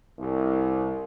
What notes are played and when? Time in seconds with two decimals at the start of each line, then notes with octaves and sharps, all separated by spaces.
0.19 C2